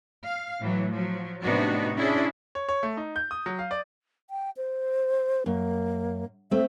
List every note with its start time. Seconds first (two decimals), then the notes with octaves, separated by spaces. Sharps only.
0.24 F5
0.60 A2 E3 F#3
0.91 F3 F#3
1.43 A2 C3 B3 D4 D#4 F#4
1.96 C#4 D4 E4 G#4
2.55 C#5
2.68 C#5
2.83 A3
2.97 D#4
3.16 G6
3.31 D#6
3.46 F#3
3.59 F5
3.71 D5
4.30 G5
4.57 C5
5.46 F#2 A#3
6.51 A3 C4 E5